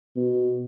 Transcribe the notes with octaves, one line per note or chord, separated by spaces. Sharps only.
B2